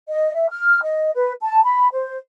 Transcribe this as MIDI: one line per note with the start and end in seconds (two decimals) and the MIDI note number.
0.09 0.32 75
0.34 0.49 76
0.50 0.81 89
0.82 1.11 75
1.15 1.32 71
1.41 1.60 81
1.64 1.88 83
1.93 2.16 72